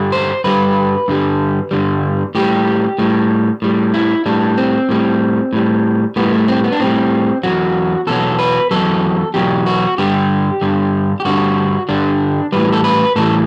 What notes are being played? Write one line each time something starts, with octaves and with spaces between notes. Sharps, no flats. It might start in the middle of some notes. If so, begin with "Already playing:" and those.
Already playing: G2 D3 G3
C5
G2 D3 G3 B4
G2 D3 G3
G2 D3 G3
A2 G3 G4
A2 G3
A2 G3
E4
A2 G3 D4
C4
A2 G3
A2 G3
A2 G3 B3
A3
C4
B3
D4
A2 G3 C4
E2 B2 F#3 F#4
E2 B2 F#3 A4
B4
E2 B2 F#3 A4
E2 B2 F#3 G4
F#4
G2 D3 G3 G4
G2 D3 G3
G4
G2 D3 G3 F#4
G2 D3 G3 D4
A2 E3 G3 B4
A4
B4
A2 E3 G3 A4